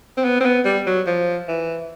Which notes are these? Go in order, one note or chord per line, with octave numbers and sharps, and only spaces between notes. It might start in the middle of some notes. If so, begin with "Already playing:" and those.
C4
B3
C4
B3
G3
F#3
F3
E3